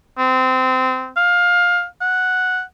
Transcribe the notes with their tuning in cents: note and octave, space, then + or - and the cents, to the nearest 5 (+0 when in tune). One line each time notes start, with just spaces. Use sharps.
C4 -20
F5 +20
F#5 -5